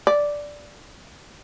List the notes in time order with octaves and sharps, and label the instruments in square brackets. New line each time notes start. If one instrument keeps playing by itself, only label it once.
[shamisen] D5